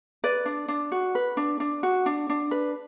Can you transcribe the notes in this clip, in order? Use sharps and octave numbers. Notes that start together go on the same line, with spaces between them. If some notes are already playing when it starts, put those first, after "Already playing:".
B4 D5
D4
D4
F#4
B4
D4
D4
F#4
D4
D4
B4